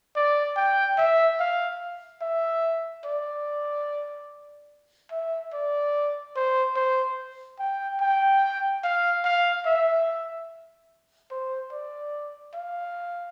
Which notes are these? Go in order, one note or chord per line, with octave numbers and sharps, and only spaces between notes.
D5
G5
E5
F5
E5
D5
E5
D5
C5
C5
G5
G5
F5
F5
E5
C5
D5
F5